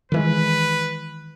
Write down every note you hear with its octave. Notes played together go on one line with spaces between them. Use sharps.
D#3 E3 G#3 B4